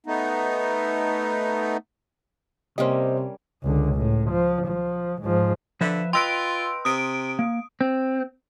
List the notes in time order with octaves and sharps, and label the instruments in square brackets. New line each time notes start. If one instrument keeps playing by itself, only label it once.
[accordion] A3 B3 D#4
[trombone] C3 [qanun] G3 A#3 C#4 [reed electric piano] C5 D#5
[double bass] C#2 D3
A2
F3
F3
G#2 F3
[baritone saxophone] D3 [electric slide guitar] F3 B4 E5
[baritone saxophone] F4 [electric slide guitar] B4 D#5 G5 [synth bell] C6 E6 D7
[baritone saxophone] C3 [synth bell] D#6 D7
[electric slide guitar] A#3
C4